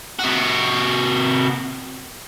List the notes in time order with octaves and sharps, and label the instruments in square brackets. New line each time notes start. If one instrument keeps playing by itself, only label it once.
[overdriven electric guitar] C3 F#4